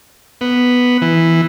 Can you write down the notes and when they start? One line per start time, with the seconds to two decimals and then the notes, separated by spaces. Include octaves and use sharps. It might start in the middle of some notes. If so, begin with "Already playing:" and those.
0.41 B3
1.02 E3